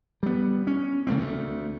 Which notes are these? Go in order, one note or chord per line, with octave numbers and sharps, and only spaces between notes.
G3 B3
C#4
C#3 A3 A#3 C4
D2 A3